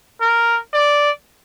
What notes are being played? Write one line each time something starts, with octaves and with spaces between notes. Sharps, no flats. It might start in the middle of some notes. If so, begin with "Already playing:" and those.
A#4
D5